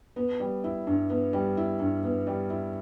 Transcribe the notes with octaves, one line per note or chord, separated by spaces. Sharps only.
B3
G3
E4
G2
B3
G3
E4
G2
B3
G3
E4